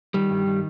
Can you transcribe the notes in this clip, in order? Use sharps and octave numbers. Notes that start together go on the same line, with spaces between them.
D#3 G3
G2
D#3